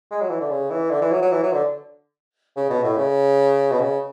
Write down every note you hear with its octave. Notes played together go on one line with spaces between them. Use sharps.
G#3
F#3
E3
D3
C#3
E3
D3
E3
F#3
F#3
E3
F#3
D3
C#3
B2
A2
C#3
B2
C#3